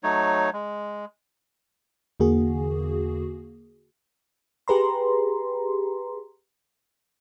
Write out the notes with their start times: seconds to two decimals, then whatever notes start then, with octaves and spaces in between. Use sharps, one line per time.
0.03 F#3 A3 D#4 C#5
0.53 G#3
2.20 E2 D3 A#3 F#4 G#4
4.68 G4 G#4 B4 A#5 C6